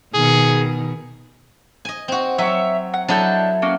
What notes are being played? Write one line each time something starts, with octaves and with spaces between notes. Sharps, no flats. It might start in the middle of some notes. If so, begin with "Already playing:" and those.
B2 D#3 G#4
D#5 G#5
C4 F#4
F#3 C#5 E5
F#5
F#3 D4 E4 A4 D#5 G6
A#3 C#4 F#4